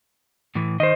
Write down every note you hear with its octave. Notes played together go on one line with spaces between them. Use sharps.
A2 E3
D#3 C5 D#5